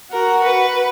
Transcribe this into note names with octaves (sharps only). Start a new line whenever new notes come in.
F#4 A#4
B4